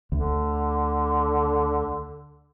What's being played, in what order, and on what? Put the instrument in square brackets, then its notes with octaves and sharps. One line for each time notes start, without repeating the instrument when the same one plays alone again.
[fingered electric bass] D2 [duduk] D3